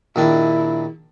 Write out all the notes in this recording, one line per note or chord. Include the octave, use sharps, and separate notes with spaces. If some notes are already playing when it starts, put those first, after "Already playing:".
A#1 D#3 D4 E4